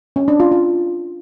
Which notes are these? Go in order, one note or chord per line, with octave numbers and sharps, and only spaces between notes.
C#4
D4
F4
F4